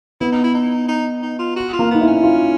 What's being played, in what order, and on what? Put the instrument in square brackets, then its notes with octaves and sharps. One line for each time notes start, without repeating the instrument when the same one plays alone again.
[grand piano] B3 [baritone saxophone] E4
[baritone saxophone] D#4
E4
D#4
D#4
D#4
F4
F#4
F4
[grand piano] A#3
[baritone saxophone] B3 [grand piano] D#4
[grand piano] E4
[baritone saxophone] C#4
[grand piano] F4